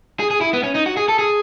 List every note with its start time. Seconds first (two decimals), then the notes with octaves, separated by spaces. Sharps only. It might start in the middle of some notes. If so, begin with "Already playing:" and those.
0.20 G#4
0.31 G#4
0.41 E4
0.53 B3
0.63 C#4
0.75 D#4
0.86 F#4
0.97 G#4
1.08 A4
1.19 G#4